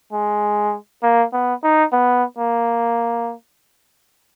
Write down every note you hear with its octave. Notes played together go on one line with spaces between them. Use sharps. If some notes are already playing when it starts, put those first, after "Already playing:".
G#3
A#3
B3
D#4
B3
A#3